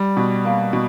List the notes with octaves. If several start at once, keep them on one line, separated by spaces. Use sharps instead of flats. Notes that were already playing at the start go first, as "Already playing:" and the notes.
Already playing: G3
B2
A#3
B2